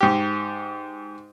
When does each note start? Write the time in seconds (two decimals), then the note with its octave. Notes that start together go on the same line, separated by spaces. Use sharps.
0.01 G#2 G4